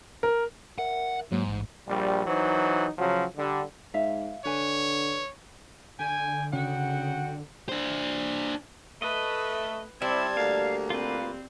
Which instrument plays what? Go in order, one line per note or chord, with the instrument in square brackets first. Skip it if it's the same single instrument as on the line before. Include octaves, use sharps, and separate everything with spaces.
[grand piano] A#4
[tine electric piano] A#4 E5 [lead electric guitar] F#5
[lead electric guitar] G#2 [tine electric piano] F#3 A#3
[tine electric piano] A1
[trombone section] A#1 G3
E3 F#3 D#4 C5
C#3 F3 F#3
D3 G3
[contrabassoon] G#2 [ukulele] E5 F5
[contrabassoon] D3 [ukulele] B4 G#5 [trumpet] C#5
[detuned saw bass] D3 [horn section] G5 G#5
[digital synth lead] C#3 [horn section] F#4 F#5 G5
[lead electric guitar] D4 C5
[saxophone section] A3 [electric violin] B4 [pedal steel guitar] D#5
[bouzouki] G3 [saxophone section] C4 [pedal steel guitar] E4 E5 [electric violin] A5 G#6
[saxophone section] D2 A#3 [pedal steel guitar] F5
[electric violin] C4 [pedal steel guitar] F4 B4